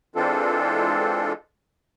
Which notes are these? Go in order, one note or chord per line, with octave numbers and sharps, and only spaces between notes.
E3 G#3 C4 D4 F4 A4